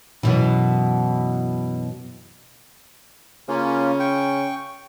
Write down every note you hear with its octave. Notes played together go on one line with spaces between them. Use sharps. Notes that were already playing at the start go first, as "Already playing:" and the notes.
F#2 B2 E3
C#3 A#3 C#4 F4
G5 C#6